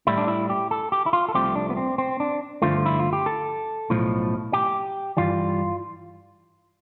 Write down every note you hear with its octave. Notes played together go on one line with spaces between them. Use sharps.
A2 G3 E4
D4
E4
G4
A4
G4
E4
F4
A4
C2 C3 F3 A3 G4
D4
B3
C4
C4
D4
G2 D3 F3 A3 F4
E4
F4
G4
A4
B1 A2 F3
G4
G2 E3 G3 F4